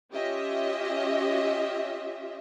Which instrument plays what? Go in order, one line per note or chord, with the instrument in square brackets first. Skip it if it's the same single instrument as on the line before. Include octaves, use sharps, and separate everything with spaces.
[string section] C#4 F4 G4 D#5 E5